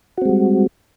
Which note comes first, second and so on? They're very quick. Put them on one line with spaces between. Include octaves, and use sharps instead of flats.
F#4 C4 G#3 G3